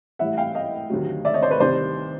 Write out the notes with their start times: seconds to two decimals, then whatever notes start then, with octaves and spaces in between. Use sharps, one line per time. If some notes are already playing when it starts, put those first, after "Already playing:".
0.19 A2 E3 G3 E5 F#5
0.38 F5 G5
0.55 D#5 F5
0.90 D2 C3 D#3 F#3
1.25 D5 E5
1.34 C#5 D#5
1.42 C5 D5
1.51 B4 C#5
1.60 C2 C3 D#3 C5 D5